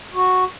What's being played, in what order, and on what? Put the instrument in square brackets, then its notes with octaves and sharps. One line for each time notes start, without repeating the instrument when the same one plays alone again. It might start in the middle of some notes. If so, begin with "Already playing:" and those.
[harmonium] F#4